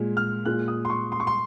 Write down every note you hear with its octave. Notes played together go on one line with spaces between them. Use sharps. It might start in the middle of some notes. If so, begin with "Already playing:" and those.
Already playing: A#2 G#3
F6
A#2 G#3 F#6
D#6
C6
C#6
C6
C#6
C6